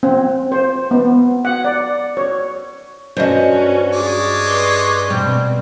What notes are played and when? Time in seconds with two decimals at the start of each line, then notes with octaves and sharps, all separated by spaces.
0.03 C4
0.52 C5
0.91 B3
1.45 F#5
1.65 D5
2.17 C#5
3.17 G2 C#4 F#4 C5 D#5
3.93 G#3 C#5 D5
4.46 B4 C6
5.10 B2 G3 C4